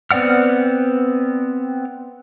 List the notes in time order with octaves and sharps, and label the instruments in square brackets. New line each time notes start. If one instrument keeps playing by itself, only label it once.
[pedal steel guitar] B3 C4 D5 F#5 F6